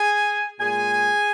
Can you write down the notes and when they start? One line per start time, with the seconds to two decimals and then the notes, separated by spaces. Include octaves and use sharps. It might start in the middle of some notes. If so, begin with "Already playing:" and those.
Already playing: G#4 G#5
0.60 A#2 G#3 G#4 G#5